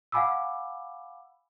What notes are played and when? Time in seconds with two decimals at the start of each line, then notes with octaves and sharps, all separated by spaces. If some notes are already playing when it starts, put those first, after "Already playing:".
0.12 F5 F#5 G#5 B5 D6 E6